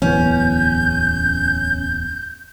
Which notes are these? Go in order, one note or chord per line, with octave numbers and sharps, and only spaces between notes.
D1 E2 B3 C#4 G6